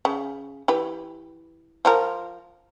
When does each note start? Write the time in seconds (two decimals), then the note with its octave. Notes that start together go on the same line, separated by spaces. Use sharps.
0.05 C#3
0.68 E3 G4 B4
1.85 F3 F4 A#4